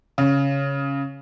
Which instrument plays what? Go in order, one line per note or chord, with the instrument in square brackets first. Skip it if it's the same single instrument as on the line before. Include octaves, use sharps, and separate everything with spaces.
[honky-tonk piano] C#3